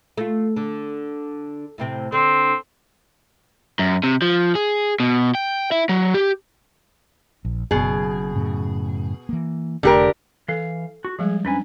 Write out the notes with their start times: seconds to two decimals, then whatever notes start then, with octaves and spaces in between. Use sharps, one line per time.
0.17 A3 F4
0.56 D3
1.78 A2 C3 C4
2.12 D3 C4
3.79 F#2
4.03 C3
4.22 F3
4.55 G#4
5.00 B2
5.35 G5
5.72 E4
5.89 F#3
6.14 G4
7.45 A#1
7.71 F#1 F#2 B2 G#4
8.36 F#2 A2 C#3
9.29 E3 A#3
9.83 F1 D3 A3 G4 A#4
10.48 E3 A4 F5
11.05 F#4
11.19 F3 G3 G#3 G#4
11.45 F2 C#4 D4 B4 G#5